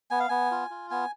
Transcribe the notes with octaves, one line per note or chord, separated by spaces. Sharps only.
B3 G#5
F5
B3 G#5
F4
F4
B3 G#5